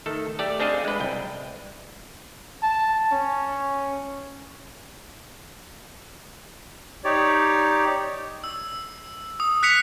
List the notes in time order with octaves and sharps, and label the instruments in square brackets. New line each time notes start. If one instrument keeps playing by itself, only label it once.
[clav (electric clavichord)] D#3 A3 A4
A3 G4 D5 A5
C4 D4 G#4 A4 D#5 F5
G#3 B4
C2 G5
[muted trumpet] A5
C#4
[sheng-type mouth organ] D#4 G4 C#5 D5
[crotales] E6
D#6
F#6 B6 C#7 F7